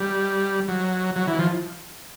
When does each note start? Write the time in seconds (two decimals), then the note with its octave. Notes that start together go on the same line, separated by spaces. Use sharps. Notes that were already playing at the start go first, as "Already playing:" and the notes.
Already playing: G3
0.68 F#3
1.16 F#3
1.27 E3
1.39 F3